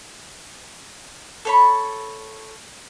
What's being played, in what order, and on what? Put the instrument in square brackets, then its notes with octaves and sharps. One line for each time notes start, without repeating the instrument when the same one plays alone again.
[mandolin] A4 C#5 B5